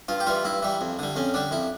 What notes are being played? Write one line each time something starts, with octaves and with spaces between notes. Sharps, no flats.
G2 F4
G4
E3 G3 F4
G2 E4
E3 G3
F2
D3 G3
F2 C#4
D3 G3 D4
F2 E4